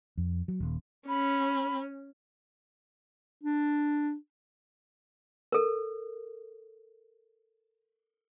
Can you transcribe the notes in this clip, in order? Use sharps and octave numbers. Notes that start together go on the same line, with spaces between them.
F2
F#3
D#1
C#4 B5
D4
A4 A#4